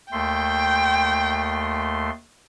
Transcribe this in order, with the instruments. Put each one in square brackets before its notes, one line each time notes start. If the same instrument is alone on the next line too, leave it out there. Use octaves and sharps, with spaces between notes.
[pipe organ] D#2 A3 C6 [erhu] G5